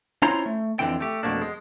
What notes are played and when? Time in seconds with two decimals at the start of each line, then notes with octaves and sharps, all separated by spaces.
0.22 C#4 E4 F4 C5 C#5 A#5
0.46 A3
0.79 F2 G#2 D3 E3 C4 G5
1.00 A3 G4
1.23 F2 B2 E3 A3 A#3 D4
1.42 G#3